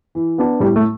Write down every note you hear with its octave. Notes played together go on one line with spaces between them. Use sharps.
E3
B3 D4
A2 G3
A3